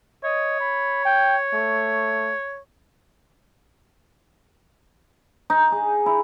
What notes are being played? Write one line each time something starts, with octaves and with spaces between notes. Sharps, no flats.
C#5 D#5
B5
G5
A3
D#4
G#4
E4